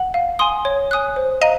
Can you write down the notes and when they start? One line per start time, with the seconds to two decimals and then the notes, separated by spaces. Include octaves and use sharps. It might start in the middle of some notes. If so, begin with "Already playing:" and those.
Already playing: F#5
0.14 F5
0.39 G#5 C6 D#6
0.65 C#5
0.91 G#5 D#6 F#6
1.16 C5
1.41 D#5 F5 A#5